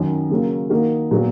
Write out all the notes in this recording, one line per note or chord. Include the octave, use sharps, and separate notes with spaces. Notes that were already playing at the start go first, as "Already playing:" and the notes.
Already playing: F#2 D#3 F#3
C#3 F#3 A#3 C#4
D#3 A#3 D#4 F#4
A#2 F#3 B3 F#4